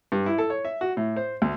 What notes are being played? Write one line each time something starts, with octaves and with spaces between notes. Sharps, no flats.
G2
E4
A4
C#5
E5
F#4
A2
C5
D2